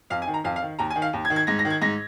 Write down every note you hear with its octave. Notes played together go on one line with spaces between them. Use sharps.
F2 F5
G#5
D#3
A#5
F2 F5
F5
D#3
D#2 A#5
G#5
D#3
F5
D#2
G#6
D#3
G#6
G#2 A#6
A#6
D#3
G#6
G#2 A#6